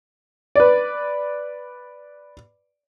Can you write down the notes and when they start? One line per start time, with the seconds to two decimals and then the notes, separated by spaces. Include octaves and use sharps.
0.56 B4 D5